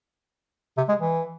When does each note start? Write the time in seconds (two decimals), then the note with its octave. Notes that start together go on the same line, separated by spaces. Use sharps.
0.77 C3
0.88 G#3
0.99 E3